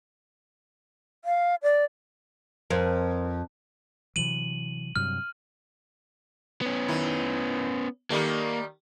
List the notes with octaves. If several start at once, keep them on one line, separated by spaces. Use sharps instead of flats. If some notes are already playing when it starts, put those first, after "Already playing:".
F5
D5
F2 A#4 C5
C3 E3 F#3 D#7 F#7
G2 C3 F#3 F6
B3 C#4
D#3 E4
D#3 G3 A3 A#3